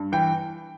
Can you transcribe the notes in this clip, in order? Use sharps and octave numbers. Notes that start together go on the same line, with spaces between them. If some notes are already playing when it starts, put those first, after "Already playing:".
Already playing: G2
E3 G5